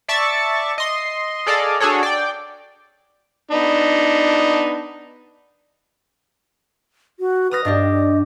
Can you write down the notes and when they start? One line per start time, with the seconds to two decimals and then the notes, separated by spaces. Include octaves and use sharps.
0.08 D5 E5 A5 C#6 A6
0.78 D#5 C6
1.46 G#4 A4 D5 D#5 F5
1.80 D4 F#4 G#4 A4 C#5
2.03 D5 G5
3.51 B3 D4 D#4
7.20 F#4
7.51 B4 D#6 F6 A#6
7.65 G2 D4 G4 D#5